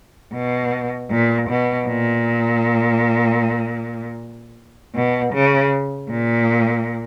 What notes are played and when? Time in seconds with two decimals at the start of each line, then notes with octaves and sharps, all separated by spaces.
0.33 B2
1.10 A#2
1.48 B2
1.87 A#2
4.94 B2
5.32 C#3
6.09 A#2